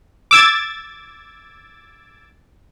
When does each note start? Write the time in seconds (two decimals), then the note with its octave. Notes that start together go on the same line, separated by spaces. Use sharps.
0.31 D6 E6 G#6 A6